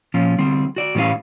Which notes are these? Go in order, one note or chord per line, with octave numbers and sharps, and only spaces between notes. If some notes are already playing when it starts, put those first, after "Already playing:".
A#2 F3 C#4 F4
D3 G3 C4
F#4 D5
A2 E3 G3 C#4 B4 F5